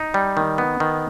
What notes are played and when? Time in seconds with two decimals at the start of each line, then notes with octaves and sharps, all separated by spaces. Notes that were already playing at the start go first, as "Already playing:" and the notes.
Already playing: D#4
0.14 G3
0.37 D#3
0.58 B3
0.80 D#3